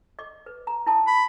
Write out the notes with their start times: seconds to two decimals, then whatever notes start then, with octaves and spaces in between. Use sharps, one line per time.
0.19 D#5 D6
0.46 B4
0.67 A#5
0.86 E4 A5 D#6
1.07 B5